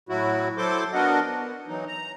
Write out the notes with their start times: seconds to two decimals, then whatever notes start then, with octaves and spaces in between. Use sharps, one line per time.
0.09 A2 F#3 E4 F#4
0.57 F#3 E4 A4 C5 C6 D6
0.93 B3 D4 F#4 A#4 D#5 F#5
1.25 B3
1.68 E3 F#3 D#4
1.88 A#5